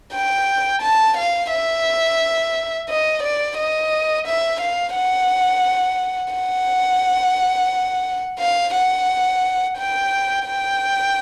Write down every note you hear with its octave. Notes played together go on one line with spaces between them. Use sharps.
G5
A5
F5
E5
D#5
D5
D#5
E5
F5
F#5
F#5
F5
F#5
G5
G5